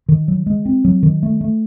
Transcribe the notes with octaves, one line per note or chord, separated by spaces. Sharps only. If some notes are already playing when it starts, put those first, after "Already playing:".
D#3
F#3
G#3
C4
F#3
D#3
A3
A3